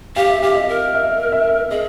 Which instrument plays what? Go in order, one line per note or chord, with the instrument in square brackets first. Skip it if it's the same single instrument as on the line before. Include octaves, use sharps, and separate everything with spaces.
[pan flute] G4 [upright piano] F5
[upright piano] E5
[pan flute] G4 [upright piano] F5
[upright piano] D#5
[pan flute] A#4
[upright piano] E5
E5
[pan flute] G#4 [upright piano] D#5